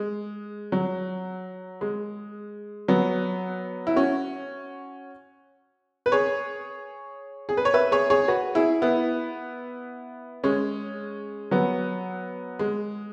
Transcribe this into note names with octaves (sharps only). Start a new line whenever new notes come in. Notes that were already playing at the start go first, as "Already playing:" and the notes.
Already playing: G#3
F#3
G#3
F#3 B3
E4
C#4 F#4
B4
G#4 C#5
G#4
B4
C#5
B4 E5
G#4 C#5
G#4 C#5
F#4 B4
E4 G#4
B3 E4
G#3 C#4
F#3 B3
G#3